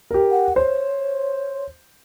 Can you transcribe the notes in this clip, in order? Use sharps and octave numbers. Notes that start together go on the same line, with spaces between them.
G4 A#4
F#5
C5 C#5